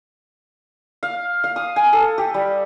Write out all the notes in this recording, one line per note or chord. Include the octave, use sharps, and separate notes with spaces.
F5
F5
D#6
G#5
A4
G4
G3